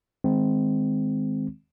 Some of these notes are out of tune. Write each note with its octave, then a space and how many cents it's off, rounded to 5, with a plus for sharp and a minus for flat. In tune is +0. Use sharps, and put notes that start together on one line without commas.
D#3 +5 G#3 +0 C4 -10